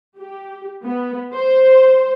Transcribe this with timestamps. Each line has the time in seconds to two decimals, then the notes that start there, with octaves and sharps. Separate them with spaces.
0.18 G4
0.84 B3
1.34 C5